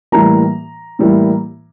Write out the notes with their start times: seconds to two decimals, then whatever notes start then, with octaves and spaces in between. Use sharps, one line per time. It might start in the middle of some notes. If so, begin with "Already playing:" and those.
0.12 A2 E3 G3 A#3 E4 A#5
0.99 A2 E3 G3 A#3 E4